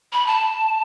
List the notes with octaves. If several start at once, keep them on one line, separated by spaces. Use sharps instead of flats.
B5
A5